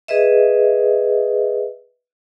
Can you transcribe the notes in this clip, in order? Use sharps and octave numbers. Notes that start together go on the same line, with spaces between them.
G#4 B4 D#5 E5